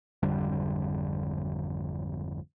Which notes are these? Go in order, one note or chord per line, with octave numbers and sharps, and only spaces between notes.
G#1 F2 D3 G3